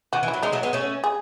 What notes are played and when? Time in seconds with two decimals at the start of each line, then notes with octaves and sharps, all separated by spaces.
0.13 D#3 F#4
0.23 E3
0.28 E4
0.33 F#3
0.42 G#3 D#4
0.52 F#3 A3
0.63 G#3 B3
0.73 A3 C#4
1.04 G#4